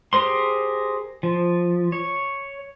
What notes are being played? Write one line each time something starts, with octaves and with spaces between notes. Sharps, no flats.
G4 G#4 A#4 C5 C6
F3
C#5